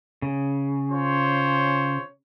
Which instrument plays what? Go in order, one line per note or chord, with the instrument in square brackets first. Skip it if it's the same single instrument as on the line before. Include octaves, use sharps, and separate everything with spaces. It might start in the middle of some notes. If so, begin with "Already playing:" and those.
[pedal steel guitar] C#3
[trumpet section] F4 C5 C#5